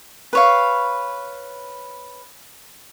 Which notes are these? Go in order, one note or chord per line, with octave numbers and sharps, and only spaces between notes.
B4 C#5 F5